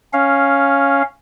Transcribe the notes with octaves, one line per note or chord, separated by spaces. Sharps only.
C#4 F5